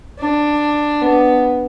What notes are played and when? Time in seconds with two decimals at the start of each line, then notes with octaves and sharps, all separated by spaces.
0.19 D4
1.01 B3